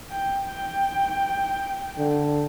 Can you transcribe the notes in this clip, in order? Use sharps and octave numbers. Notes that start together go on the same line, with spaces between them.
G5
G5
D3